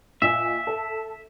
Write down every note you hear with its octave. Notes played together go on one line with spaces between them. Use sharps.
A#2 D#5 E5 G#5
A4